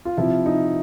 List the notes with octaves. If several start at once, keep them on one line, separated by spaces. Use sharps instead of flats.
F4
C3 F3 E4
D#4